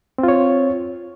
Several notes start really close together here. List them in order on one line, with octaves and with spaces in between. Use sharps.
C4 F4 C#5